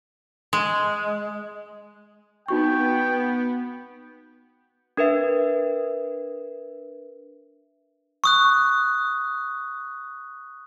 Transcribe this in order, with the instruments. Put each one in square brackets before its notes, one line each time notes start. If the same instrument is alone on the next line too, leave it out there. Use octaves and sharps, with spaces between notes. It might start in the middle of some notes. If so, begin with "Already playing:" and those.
[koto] G#3
[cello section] B3 [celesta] D#4 F#4 C#6 [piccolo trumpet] G5
[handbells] D4 A#4 B4 E5
[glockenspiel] C#6 D#6 F#6